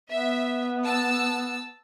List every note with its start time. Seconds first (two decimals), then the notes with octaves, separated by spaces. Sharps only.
0.12 B3 E5
0.84 A5 E6